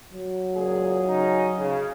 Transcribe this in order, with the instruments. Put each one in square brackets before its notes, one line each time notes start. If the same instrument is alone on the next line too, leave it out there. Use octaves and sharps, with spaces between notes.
[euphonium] F#3
[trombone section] C#2 A#2 G#4
C#3 C#4 D#4
C#3